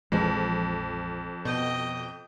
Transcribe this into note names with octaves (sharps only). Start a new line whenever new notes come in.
A#1 F2 E3 G#3
B2 D#5 G5